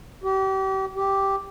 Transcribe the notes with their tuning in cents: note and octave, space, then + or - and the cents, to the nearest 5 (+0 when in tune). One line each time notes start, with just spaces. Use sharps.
G4 -35
G4 -5